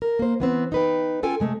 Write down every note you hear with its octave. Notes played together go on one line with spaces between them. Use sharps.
A#4
A#3 C5
E3 B3 C4
D#4 B4 G5
C#4 F4 A4 G5 G#5
C3 G#3 A3